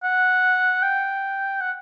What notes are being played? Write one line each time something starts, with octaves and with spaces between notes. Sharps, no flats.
F#5
G5
F#5